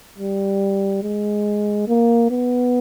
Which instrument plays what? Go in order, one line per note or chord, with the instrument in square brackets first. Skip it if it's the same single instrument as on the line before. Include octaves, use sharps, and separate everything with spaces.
[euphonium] G3
G#3
A#3
B3